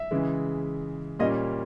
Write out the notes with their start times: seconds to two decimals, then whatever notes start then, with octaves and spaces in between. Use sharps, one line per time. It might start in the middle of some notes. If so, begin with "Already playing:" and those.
Already playing: E5
0.11 C#3 E3 G#3
1.19 A#2 G3 A#3 C#4 D#5